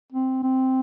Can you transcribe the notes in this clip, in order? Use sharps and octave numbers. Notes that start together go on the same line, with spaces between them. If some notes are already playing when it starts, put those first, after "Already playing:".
C4
C4